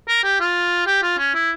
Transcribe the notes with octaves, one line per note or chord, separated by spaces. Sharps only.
A#4
G4
F4
G4
F4
C#4
E4